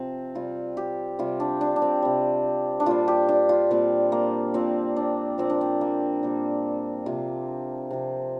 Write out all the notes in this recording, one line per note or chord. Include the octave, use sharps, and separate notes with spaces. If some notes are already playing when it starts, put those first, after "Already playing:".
Already playing: C3 F3 C4
C3 G3 F4
G4
C3 G3 F4
D4
D4
D4
C4
C3 G3
D4
A#2 G3 F4
G4
D4
F4
A#2 G3 C4
A#3
A#2 F3 C4
D4
A#2 F3 C4
D4
C4
A#3
A#2 G3
C3 F3 F4
C3 F3